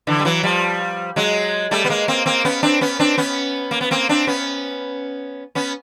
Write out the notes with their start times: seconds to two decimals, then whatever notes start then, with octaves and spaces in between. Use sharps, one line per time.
0.07 D3 E3
0.20 G3
0.25 E3 F#3
0.43 F3 G3
1.16 F#3 G#3
1.71 G3 A3
1.85 B3
1.89 G#3 A#3
2.08 A#3 C4
2.26 A#3 C4
2.45 B3 C#4
2.63 C4 D4
2.81 B3 C#4
2.99 C4 D4
3.18 B3 C#4
3.71 A#3
3.81 B3
3.91 A#3 C4
4.09 C4 D4
4.27 B3 C#4
5.55 B3 C#4